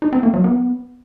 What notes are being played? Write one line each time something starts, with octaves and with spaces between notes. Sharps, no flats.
D#4
C4
A#3
F#3
B3